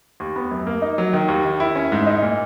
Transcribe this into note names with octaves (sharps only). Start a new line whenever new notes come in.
D#2
B3
F#2
A#3
D#4
F#3
D#3
D#2
D#3
E4
C#4
G#2
D#4
A#2